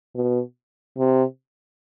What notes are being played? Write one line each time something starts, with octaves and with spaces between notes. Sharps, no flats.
B2
C3